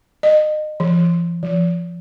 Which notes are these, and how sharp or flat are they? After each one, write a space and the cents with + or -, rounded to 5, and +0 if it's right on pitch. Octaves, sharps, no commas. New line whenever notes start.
D#5 -30
F3 -40
F3 -20